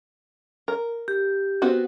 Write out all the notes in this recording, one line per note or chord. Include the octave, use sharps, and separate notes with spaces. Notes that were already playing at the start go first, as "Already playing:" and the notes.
A#4
G4
B3 C4 F#4